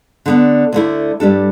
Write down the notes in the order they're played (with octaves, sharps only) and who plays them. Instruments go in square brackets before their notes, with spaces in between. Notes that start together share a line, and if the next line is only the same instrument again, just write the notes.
[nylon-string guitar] D3 B3 D4
D2 D3 A3 E4
G2 G3 D4 A4